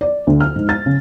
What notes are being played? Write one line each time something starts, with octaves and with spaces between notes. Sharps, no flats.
D5
D2
F6
G#2
A6
C#3